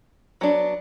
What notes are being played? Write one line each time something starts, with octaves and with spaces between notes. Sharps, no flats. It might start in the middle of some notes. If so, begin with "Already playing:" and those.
F#3 B3 D4